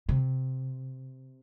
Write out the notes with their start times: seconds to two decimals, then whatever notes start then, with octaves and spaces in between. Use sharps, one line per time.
0.09 C3